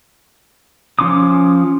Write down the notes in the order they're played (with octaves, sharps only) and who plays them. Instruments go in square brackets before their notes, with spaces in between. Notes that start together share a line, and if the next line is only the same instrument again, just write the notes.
[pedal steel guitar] F3 C#4 C6 D6 D#6